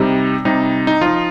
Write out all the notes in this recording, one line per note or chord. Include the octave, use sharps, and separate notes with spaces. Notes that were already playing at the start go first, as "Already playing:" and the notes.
Already playing: C3 G3 D#4
C3 G3 D#4
D#4
F3 D#4 F4